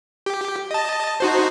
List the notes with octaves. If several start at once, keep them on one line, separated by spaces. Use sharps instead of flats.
G4
D#5 A5
D#4 F#4 C5